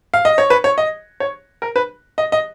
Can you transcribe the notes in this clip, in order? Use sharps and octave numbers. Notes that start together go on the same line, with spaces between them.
F5
D#5
C#5
B4
C#5
D#5
C#5
A#4
B4
D#5
D#5